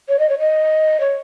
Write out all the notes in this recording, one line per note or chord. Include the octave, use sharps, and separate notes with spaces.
C#5
D#5
C#5
D#5
C#5